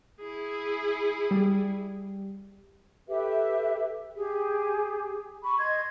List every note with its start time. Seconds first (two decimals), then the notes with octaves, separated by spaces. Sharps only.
0.20 E4 G#4
1.31 G3
3.09 G4 A4 B4 E5
4.17 G4 G#4
5.43 B5 C#6
5.59 D#5 C6 G#6